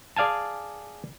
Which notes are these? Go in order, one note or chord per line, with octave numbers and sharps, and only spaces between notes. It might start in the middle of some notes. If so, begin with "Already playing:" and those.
G#4 D5 F5 G#5 A5